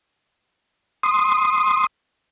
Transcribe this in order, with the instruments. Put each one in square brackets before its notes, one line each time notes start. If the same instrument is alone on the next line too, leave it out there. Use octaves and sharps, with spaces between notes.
[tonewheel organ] C6 D#6